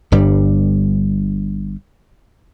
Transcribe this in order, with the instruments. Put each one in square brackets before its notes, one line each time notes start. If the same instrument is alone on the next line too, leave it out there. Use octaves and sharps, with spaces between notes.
[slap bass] G1 G2 G3